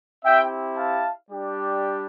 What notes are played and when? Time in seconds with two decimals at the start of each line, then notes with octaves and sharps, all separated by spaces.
0.25 C4 E4 G4 E5 G5
0.77 F5 A5
1.29 G3 D4 G4